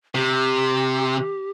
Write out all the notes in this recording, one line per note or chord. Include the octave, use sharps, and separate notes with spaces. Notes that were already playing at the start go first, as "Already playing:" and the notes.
C3 G4